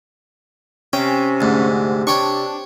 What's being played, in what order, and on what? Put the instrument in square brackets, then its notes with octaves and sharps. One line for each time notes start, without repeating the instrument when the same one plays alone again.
[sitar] C3 [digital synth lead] C#4 [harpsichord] G5
[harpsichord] D2 G#2
[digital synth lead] D4 [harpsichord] C#5 G5 C#6